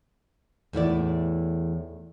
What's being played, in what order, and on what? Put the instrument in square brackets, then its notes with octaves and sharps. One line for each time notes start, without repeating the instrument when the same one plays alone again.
[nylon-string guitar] E2 A2 E4 D5